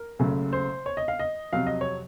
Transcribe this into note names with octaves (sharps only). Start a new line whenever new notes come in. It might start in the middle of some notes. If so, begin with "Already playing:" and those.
Already playing: A#4
F#1 F#2 C#3 A3
C5
C#5
D#5
F5
D#5
F2 C3 F#3 F5
D#5
C#5